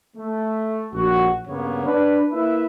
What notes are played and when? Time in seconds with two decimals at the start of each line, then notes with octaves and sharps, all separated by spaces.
0.16 A3
0.93 A#1 F#4
1.48 G2 C#3 A#3 B3 C#5
1.85 D4 B4
2.33 A#3 E4 B4 E5